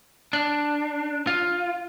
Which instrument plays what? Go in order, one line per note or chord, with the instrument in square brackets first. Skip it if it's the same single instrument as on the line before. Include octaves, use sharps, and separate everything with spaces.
[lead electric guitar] D4
F4